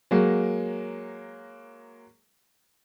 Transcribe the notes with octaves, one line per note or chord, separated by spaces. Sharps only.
F#3 G#3 A#3